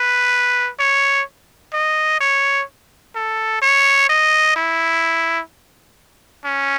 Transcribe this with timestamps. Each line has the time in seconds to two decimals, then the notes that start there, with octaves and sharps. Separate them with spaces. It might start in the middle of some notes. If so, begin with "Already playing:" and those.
Already playing: B4
0.79 C#5
1.73 D#5
2.21 C#5
3.15 A4
3.62 C#5
4.09 D#5
4.56 E4
6.45 C#4